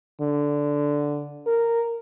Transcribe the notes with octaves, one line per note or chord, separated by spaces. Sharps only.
D3
A#4